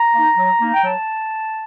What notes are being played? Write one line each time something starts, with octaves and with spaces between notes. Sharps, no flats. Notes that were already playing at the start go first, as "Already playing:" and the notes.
Already playing: A#5
A#3 D#4
F#3
A#3 D#4
G5
F#3 A5